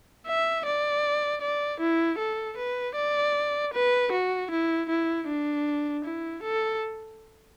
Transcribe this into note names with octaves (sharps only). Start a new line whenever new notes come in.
E5
D5
D5
E4
A4
B4
D5
B4
F#4
E4
E4
D4
E4
A4